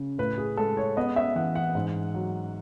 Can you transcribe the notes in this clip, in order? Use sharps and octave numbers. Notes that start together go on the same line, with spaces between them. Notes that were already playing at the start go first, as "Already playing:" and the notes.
Already playing: C#3
A2 B4
G#4
G#3 A4
C#5
B3 D#5
E5
E3 F#5
F#5
G#2
F#3